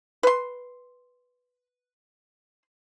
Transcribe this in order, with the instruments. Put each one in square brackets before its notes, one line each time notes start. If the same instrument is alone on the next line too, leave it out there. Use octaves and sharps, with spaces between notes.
[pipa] B4 C6